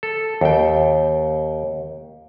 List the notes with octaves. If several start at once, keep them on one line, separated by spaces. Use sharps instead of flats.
A4
D#2 G5